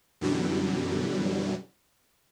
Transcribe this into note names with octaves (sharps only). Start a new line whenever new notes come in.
F#2 B2 D3 E3 F#3 G3